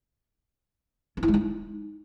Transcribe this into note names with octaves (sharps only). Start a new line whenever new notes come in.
C#4
E4
G#3
D#4